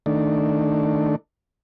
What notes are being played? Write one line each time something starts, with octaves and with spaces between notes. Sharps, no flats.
D#3 A3 D4